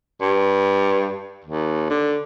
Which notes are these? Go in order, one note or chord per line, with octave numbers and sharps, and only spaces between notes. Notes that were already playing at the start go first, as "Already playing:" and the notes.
G2
D#2
D3